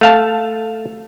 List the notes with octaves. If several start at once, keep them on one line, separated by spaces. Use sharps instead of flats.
A3 F5 A5